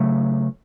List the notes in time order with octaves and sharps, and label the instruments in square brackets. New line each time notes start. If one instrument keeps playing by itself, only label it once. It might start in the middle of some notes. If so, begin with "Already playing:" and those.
Already playing: [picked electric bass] C#3 F#3 A3